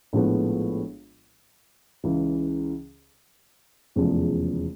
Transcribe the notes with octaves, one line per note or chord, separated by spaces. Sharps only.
A#1 A2 F3 G#3 B3
C#2 C#3 E3
F1 E2 C#3 F3 G#3